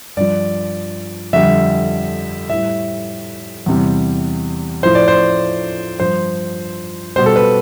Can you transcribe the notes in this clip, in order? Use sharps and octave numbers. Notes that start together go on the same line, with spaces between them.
G2 F3 D5
F2 D3 G3 E5
A2 G3 E5
E2 C3 G3
A2 F3 C5
D5
C5
G2 F3 C5
B2 G3 C5
A4
B4